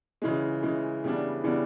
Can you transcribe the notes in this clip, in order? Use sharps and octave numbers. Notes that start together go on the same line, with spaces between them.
C#3 E3 G#3
C#3 E3 G#3
C#3 E3 G3 B3 D4
C#3 E3 G3 B3 D4